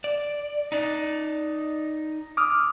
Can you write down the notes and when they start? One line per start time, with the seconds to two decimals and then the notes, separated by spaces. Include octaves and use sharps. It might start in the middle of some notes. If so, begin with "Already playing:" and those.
0.04 D5
0.72 D#4 D5
2.37 D6 D#6 F6